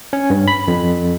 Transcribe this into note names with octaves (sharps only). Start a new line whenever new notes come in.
C#4
G2
B5
F2